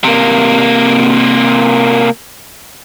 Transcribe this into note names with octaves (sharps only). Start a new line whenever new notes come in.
C3 A#3